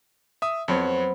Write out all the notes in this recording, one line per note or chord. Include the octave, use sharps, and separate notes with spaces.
E5 D#6
F2 F#3 B3 C4 C#5